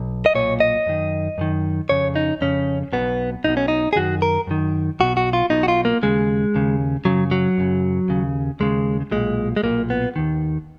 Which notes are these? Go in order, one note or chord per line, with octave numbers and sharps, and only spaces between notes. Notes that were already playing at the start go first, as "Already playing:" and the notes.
Already playing: B1
D#5
B1 A#2 C#5
D#5
F#2 D#3
F#2 D#3
F2 C#3 C#5
D#4
F2 C#3 C#4
B1 B2 B3
B1 B2 D#4
C#4
D#4
G#4
F#2 D#3 F#4
A#4
F#2 D#3
B1 B2 F#4
F#4
F4
B1 B2 D#4
F#4
F4
A#3
D#2 C#3 G#3
D#2 C#3
F#2 C#3 F#3
F#3
F#2 C#3
D#2 C#3
D#2 C#3 G#3
B1 A#2 G#3
G#3
B1 A#2 A#3
B3
D#2 D#3